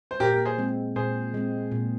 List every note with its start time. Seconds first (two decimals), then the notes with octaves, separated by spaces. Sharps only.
0.11 C5
0.20 A#2 G4 A#4
0.34 A#4
0.45 G#4 C5
0.58 G#3 C4
0.96 A#2 G#4 C5
1.34 G#3 C4
1.71 A#2